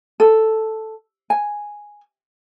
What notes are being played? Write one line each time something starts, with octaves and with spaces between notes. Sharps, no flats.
A4
G#5